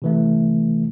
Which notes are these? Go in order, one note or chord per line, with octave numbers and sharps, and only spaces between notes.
C3 E3 A3